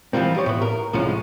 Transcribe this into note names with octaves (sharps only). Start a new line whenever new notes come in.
E3 F3 G3 A#3 C4
F3 G4 C#5
A2 B3
A#4
C2 A2 F3 G#3 C#4